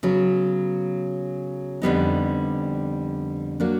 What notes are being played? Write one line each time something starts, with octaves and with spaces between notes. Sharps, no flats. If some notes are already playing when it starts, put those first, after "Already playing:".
C#3 F#3 B3
F2 D3 G3 B3 D#4
F#3 A#3 D4